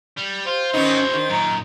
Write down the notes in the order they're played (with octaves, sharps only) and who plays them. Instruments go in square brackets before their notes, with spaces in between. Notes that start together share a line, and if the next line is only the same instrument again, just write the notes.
[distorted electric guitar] G3
[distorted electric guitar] F4 [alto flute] G4 [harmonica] C5
[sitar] D#3 B3 D#4 [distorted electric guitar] F#3 E4 [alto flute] C#4
[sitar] D#3 [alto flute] D4
[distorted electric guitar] F#2 A#2 [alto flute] A#5